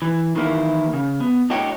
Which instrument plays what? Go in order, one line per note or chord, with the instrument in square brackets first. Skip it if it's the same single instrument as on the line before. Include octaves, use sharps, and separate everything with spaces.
[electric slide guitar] E3
D#3 E3 A#3 E4
C#3
B3
A2 D4 F#4 C#5 D#5 G5